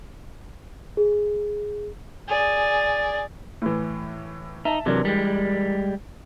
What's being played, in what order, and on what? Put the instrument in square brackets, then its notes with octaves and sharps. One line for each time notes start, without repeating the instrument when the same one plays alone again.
[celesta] G#4
[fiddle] G#4 D5
[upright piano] A2 E3
[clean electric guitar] D#4 [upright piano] E5 A5
[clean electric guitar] C3 F#3 [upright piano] E3 D4 A#4
[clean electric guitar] G3 G#3